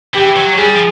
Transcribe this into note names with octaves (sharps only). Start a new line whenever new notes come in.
E3 G4
F#3
G3 G#4
F3